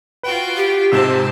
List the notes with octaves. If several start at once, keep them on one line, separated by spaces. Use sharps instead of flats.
F4 F#4 B4 G5
G4
G#2 C3 C4 C5 A5 E6